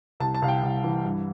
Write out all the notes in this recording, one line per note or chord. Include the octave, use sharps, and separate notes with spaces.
C2 A5
A5
C2 F5
G5
C2
E3
G2